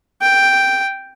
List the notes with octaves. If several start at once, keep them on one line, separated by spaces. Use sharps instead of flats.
G5